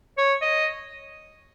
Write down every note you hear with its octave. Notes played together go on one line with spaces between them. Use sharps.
C#5
D#5